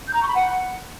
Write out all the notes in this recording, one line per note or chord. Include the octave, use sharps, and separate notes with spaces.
G6
A#5
C#6
B5
F#5